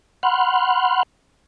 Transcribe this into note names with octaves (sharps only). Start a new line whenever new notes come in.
F#5 B5 C6 F6 F#6